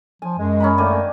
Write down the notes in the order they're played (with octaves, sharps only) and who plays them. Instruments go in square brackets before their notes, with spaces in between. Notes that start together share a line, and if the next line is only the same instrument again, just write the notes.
[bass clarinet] F3 [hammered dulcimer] G#5
[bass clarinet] F#2 [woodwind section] G#3
[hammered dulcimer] C#4 D#4 B5
[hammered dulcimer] D#3 D4 G#5 [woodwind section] A3 A#3